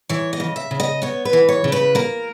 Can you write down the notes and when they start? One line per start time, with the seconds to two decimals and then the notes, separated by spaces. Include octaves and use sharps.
0.09 E3 C#5
0.33 D#5
0.40 C#3
0.56 E5
0.71 C#3
0.80 D#5
1.02 B3 C#5
1.25 B4
1.33 E3
1.49 C#5
1.64 C#3
1.72 B4
1.95 A#3 A#4